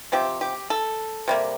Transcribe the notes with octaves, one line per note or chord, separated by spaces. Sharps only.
C3 F3 C4 G4
G4
A4
C3 G3 A#3